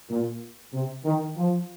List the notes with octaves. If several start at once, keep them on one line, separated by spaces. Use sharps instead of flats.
A#2
C3
D#3
F3